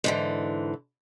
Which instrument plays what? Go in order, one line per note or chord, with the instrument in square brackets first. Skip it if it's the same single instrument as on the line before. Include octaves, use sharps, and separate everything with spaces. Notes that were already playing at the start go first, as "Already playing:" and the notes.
[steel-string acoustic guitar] G#2 D3 E3